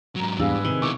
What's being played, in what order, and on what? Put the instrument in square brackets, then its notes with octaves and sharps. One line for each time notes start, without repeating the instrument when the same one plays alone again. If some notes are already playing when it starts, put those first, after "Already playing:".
[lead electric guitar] G#2 F#3 [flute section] A#5
[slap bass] E2 [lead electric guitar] G#2 [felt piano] G3 D4 F5 [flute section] G#4 B4 E6
[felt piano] C3 [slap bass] D#3
[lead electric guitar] B2 E4 [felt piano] C#6 D6